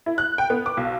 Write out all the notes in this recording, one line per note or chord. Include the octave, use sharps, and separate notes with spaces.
E4
F#6
G5
B3
D6
B1